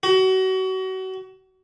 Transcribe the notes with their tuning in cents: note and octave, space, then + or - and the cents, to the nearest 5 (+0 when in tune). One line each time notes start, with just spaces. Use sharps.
F#4 +30